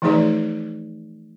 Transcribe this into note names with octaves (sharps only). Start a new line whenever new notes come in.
E3 F3 A3 D#4 G#4 D5